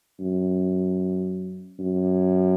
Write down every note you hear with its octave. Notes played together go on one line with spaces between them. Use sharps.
F#2
F#2